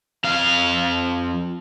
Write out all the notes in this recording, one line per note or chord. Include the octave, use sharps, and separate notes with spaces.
F2 F5